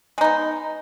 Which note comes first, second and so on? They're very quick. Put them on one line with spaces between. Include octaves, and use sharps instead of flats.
G#3 D#4 B3